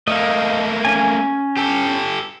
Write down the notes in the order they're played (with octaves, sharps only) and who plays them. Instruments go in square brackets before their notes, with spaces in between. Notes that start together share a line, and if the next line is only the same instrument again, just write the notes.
[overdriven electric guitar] A3 A#3 [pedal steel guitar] D#5 F5
[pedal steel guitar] C#4 G#5
[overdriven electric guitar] G4 A4